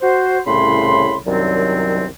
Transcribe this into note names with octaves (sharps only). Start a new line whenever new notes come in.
F#4 C5
C2 A2 C#3 B5 C6
C2 F#2 D#3 F#3 C4 D5